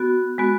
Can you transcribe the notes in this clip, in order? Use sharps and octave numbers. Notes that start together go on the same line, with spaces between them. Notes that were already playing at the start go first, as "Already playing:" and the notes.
Already playing: B3 F#4
G#3 B3 F#4